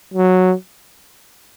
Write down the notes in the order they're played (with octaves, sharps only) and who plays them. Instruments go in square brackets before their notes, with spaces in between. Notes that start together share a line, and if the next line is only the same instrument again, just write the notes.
[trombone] F#3